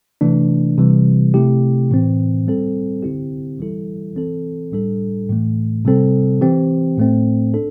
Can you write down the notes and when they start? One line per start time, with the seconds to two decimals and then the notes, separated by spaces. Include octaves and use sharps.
0.21 C3 E3 A3 D4
0.78 C3 E3 G3
1.34 C3 A3 E4 G4
1.91 A2 E3 C4
2.47 G3 C4 A4
3.02 D3 C4 E4 G4
3.59 E3 G3 E4 A4
4.16 E3 C4 A4
4.72 A2 G3 D4 A4
5.29 A2 E3 A3
5.85 C3 G3 C4 A4
6.41 E3 C4 G4
6.98 A2 A3 C4
7.54 D4 A4